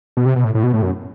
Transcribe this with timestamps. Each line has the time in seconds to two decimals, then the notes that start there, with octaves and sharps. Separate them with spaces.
0.17 B2
0.26 C3
0.36 B2
0.44 A2
0.55 A2
0.63 B2
0.73 A2
0.83 F#2